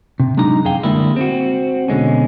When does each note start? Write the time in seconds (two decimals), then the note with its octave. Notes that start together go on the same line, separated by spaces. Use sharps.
0.20 C3
0.37 F#3 G#3 D4 D#4 A#5
0.65 F#2 G#4 F5 G5
0.83 D3 G3 G#3 A#3 E4
1.16 C4 F#4
1.88 B2 D3 G#3 C#4